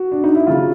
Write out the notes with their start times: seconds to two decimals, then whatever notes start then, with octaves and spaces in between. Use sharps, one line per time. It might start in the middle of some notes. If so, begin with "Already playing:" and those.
Already playing: F#4
0.12 D4
0.24 D#4
0.35 E4
0.47 C#3 F#3 F4